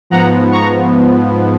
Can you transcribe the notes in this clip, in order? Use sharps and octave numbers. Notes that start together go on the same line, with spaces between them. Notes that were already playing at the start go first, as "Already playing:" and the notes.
G#2 F3 B3 F#5 A#5
A#5 C#6